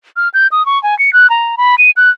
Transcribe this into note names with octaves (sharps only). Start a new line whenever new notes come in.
F6
G6
D#6
C#6
G#5
C#7
F#6
A#5
B5
D#7
F#6